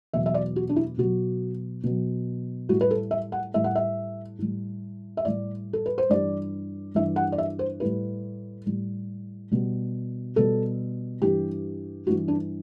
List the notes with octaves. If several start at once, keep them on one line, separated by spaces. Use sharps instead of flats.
E2 B2 F#3 E5
E5
D5
F#4
D4
E4
B2 F#3 F#4
B2 F#3
A2 G3 F#4
B4
A4
E5
F#5
A2 G3 E5
F#5
E5
A2 G3
E5
A2 G3 D5
A4
B4
C5
G2 E3 G3 D5
G2 E3 G3 E5
F#5
D5
E5
C5
A2 G3 B4
A2 G3
B2 G3
B2 G3 A4
G2 E3 G3 G4
G2 E3 G3 F#4
D4